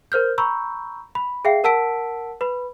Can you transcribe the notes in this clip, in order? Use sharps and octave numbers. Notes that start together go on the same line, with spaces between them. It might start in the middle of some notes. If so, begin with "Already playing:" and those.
A#4 C5 F6 G6
A#5 B5 C#6 E6 G6
B5
G#4 E5 F5 G5 C7
A#4 F#5 A5 E6 B6 D7
B4 B5